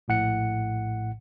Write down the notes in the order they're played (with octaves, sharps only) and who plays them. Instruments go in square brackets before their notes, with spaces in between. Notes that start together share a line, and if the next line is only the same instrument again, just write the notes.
[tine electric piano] A#1 A2 F#5 C#7